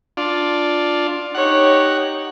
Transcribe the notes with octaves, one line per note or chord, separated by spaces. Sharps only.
D4 F4
D#4 G4 C#5 F#5